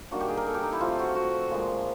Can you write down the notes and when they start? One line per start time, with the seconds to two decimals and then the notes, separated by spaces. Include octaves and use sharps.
0.11 D#3 G3 A#3 D4 F#4
0.21 G4
0.29 G#4
0.37 A#4
0.47 A4
0.54 G4
0.63 D#4
0.73 E4
0.81 F3 A3 C4 F4
0.99 F#4
1.15 F#4
1.51 A#2 F3 G#3